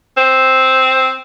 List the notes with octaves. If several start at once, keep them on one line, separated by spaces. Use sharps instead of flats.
C4